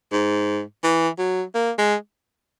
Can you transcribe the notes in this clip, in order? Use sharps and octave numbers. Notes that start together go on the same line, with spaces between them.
G#2
E3
F#3
A#3
G#3